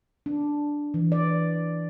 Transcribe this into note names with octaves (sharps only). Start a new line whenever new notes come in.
D4
E3
D5